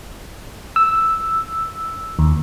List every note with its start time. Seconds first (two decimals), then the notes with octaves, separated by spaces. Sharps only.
0.76 E6
2.19 D#2